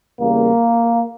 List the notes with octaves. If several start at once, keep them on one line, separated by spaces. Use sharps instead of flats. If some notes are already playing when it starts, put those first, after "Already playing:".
E2 C#3 G3 A#3